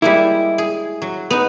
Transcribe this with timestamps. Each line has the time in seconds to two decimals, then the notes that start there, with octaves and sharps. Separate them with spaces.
0.02 G3 G#3 A#3 E4
0.58 G#4
1.02 F#3
1.30 B3 D#4